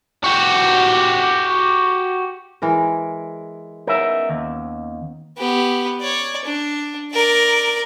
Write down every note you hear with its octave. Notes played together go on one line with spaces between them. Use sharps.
F#4 G4
E3 G#3 A#4
B3 C#4 D#4 A#4 E5
D#2
B3 G4
C#5 D5
D4
A#4 D5